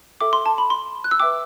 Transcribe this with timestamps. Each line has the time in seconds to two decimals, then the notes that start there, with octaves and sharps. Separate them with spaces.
0.21 A4 E5 G5 D6
0.33 C6
0.46 A5
0.58 B5
0.70 C6
1.04 F#6
1.11 E6
1.20 B4 E5 G5 D6